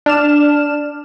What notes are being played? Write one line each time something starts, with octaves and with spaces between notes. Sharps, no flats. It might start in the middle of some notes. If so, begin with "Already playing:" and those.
D4 F6 E7